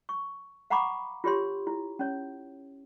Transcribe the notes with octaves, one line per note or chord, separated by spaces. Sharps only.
C#6
F5 F#5 A#5 B5 C#6 D6
F4 G4 C#5 C6
E4
C#4 C#5